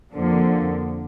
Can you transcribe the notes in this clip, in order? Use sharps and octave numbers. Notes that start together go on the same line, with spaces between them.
F2 D3 F3 A#3